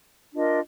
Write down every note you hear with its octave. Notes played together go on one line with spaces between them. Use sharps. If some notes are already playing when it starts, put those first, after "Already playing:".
D4 F4 A#4 D#5